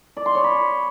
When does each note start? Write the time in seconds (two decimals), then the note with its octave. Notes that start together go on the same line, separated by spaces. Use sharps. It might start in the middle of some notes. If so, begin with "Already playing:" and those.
0.17 D5
0.26 C6
0.35 C#5
0.44 B5